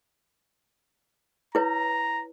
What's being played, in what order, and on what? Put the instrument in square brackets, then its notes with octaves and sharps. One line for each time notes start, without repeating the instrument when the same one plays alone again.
[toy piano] E4 B4 C#5 [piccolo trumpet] A#5